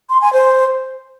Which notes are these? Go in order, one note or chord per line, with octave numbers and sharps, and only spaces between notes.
C6
G#5
C5